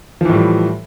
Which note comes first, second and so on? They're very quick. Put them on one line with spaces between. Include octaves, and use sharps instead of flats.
F3 E3 A2 G3